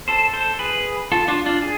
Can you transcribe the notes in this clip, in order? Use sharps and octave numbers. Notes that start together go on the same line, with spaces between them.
A4 C5
A4 C5
G#4 B4
F4 A4
D4 F4
D4 F4
G#4